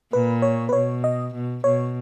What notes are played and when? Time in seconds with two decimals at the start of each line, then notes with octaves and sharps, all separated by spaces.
0.13 A#2 B4
0.42 C#5
0.69 B4
0.73 B2 C#5
1.04 D#5
1.34 B2
1.64 B2 C#5